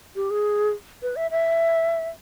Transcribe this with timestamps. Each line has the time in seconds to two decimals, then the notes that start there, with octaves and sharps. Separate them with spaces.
0.16 G4
0.30 G#4
1.03 B4
1.16 E5
1.31 E5